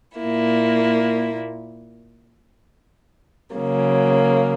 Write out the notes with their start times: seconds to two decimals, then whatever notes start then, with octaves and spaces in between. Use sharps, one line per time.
0.18 A#2 A#3 E4
3.54 C#3 F#3 A#3